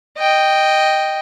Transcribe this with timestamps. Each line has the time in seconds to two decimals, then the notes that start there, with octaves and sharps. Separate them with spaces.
0.18 D#5 G5